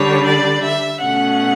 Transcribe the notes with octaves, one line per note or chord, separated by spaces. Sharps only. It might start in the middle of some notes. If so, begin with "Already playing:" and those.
Already playing: D3 G3 D4 C#5
D5
E5
B2 A3 C#4 F#5